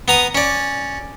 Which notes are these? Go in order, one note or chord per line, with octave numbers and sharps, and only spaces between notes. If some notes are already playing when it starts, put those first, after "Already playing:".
B3 A#5 D#6
C#4 D5